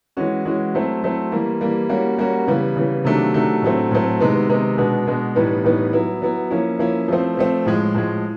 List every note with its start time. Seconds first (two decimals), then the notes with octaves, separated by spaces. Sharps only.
0.17 E3 G#3 C#4 F#4
0.45 E3 G#3 C#4 F#4
0.74 F#3 A3 C4 E4
1.03 F#3 A3 C4 E4
1.32 E3 G3 A#3
1.61 E3 G3 A#3
1.89 G3 A#3 C#4 F#4
2.18 G3 A#3 C#4 F#4
2.47 C#3 E3 G3 B3
2.76 C#3 E3 G3 B3
3.05 C3 D#3 F#3 A3 D4
3.34 C3 D#3 F#3 A3 D4
3.62 A2 F#3 A3 C4
3.91 A2 F#3 A3 C4
4.20 C3 D#3 G#3 B3 D#4
4.49 C3 D#3 G#3 B3 D#4
4.78 B2 G#3 B3 D4
5.06 B2 G#3 B3 D4
5.35 A2 E3 G3 B3 D#4
5.64 A2 E3 G3 B3 D#4
5.93 F#3 B3 E4
6.22 F#3 B3 E4
6.51 F3 A#3 C#4 E4
6.79 F3 A#3 C#4 E4
7.08 F3 A3 C4
7.37 F3 A3 C4
7.66 A2 F3 G#3
7.95 A2 F3 G#3